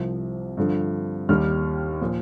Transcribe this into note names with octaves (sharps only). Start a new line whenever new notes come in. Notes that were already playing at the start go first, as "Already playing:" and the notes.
Already playing: C2 C3 F3
G2 D3 F3
D#2 D#3 G3 F6
A#2 F3